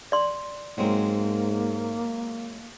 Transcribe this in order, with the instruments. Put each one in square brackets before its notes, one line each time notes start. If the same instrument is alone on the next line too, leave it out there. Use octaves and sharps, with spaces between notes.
[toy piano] D5 C6
[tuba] G#2 [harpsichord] F#3 G#3 C4 [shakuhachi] A#3